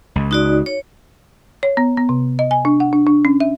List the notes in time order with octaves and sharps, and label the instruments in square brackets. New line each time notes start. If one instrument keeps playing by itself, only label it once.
[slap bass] C#2
[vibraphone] D#4 F#4 D5
C#5
[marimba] C#5
B3
B3
C3
D#5
G#5
D4
F#5
D4
D4
C#4
E5